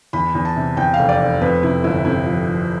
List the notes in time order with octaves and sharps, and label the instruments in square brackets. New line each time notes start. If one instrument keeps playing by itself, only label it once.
[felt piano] E2 B5
E2
A5
C3
E2 G5
F5
F1
D5
F1
F2 B4
C3 E4
G1 E4
C3 E4
F3
F3